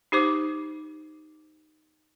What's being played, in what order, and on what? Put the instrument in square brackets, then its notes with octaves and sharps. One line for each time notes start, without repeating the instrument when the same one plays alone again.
[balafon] D#4 G4 C5 D6